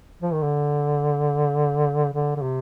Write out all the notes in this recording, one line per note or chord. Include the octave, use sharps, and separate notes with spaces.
F3
D#3
D3
D3
D3
C3